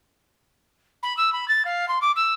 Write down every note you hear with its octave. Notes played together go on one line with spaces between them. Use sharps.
B5
E6
B5
A6
F5
C6
D6
E6